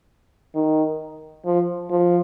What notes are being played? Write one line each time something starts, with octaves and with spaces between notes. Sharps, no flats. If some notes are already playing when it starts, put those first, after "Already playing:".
D#3
F3
F3